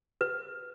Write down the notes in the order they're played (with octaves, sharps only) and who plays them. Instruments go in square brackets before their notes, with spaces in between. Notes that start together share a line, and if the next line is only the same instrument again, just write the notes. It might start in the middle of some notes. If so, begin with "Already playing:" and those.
[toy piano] B4